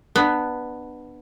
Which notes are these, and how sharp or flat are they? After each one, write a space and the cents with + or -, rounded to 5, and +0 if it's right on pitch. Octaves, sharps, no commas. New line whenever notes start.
B3 +0 D4 +25